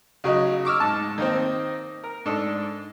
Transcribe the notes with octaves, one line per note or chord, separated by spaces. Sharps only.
C#3 F#3 D#4
C#6 D6 E6 F6
G#2 A5
D#3 A#3 C4
A#4
G#2 D4 A4